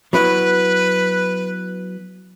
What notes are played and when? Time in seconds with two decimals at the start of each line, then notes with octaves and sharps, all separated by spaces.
0.13 F#3 B3 E4 B4